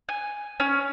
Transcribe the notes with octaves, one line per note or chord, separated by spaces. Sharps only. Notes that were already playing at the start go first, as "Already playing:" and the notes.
G#5
C#4